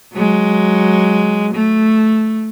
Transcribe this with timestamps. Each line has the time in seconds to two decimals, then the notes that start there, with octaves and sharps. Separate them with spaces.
0.14 F#3 G#3
1.54 A3